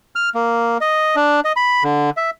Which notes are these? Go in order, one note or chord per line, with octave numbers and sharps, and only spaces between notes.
F6
A#3
D#5
D4
D#5
B5
D3
E5